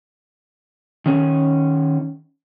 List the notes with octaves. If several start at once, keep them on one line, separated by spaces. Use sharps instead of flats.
D#3 C#4